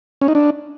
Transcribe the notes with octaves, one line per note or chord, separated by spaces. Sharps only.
C#4
D#4
D4